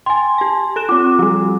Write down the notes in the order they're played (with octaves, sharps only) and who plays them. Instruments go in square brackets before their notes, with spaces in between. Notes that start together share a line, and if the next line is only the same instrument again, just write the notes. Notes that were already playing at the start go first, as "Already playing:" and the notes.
[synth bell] G5 A6 [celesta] G#5 C6
[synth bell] G4 A5
A4 F#6 E7
[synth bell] C4 F4 [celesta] D6
[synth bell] F3 G3